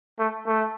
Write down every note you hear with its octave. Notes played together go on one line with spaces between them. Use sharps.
A3
A3